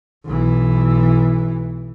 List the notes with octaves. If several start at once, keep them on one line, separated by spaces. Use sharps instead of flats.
B1 E3